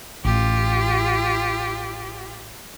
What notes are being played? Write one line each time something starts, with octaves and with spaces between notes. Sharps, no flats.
A1 F4 G4